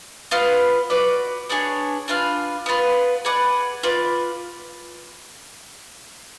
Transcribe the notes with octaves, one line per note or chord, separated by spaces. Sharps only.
B3 F4 B4 F5
F#4 B4 D5
B3 D4 G#4 C#5
D4 F4 B4 F5
B3 F4 B4
G#4 B4 D5 F#5
F4 B4 D5